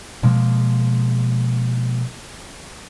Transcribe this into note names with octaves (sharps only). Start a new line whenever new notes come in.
B2 F3 G#3 A#3